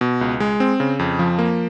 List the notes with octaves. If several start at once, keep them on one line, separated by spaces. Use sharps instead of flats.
B2
C#2
G#3
C4
C#3
F2
F3
A#3